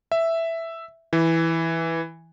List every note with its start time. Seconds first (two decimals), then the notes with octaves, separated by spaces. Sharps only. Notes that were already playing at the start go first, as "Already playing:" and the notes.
0.12 E5
1.13 E3